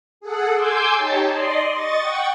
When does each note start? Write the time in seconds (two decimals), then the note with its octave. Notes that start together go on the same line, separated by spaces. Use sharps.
0.21 G#4 A4 F#5
0.54 G#5 C6 D6 E6 G6
0.96 D#4 G4 C#5 A5
1.31 D5 D#5 C6
1.71 D#5 C#6 A6
2.00 F#5 G5 C#6